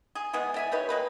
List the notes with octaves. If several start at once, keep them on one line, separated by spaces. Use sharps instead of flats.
G#4
E3 G#3 B3 G#4
D5 E5 G#5
D#4 G4 B4 C#5
G#3 A#3 B4